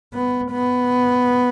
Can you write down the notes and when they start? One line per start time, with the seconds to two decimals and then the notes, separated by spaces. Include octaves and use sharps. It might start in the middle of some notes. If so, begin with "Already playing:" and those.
0.14 B3
0.51 B3